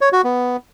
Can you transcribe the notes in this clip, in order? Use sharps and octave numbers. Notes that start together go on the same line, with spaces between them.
C#5
F#4
B3